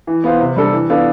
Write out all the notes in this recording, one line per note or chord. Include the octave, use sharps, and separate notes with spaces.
E3
B3 F4 C5
C3
G3 D4 A4
E3
B3 D4 F4 A4